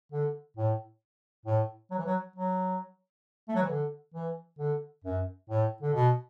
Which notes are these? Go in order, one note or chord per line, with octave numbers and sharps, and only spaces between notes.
D3
A2
A2
F#3
E3
F#3
F#3
A3
F#3
E3
D3
E3
D3
F#2
A2
D3
B2